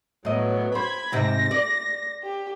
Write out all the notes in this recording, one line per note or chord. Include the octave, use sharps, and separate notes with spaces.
A2 F#3 B3 D#5
C5 B5 G#6
G#2 C3 C4 A#6
D5
G4